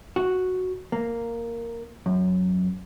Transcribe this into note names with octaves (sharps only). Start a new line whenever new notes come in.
F#4
A#3
F#2